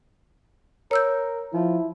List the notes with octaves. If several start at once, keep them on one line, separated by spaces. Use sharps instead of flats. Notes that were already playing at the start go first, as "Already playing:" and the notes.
A#4 C#5 E6 G6
F3 E4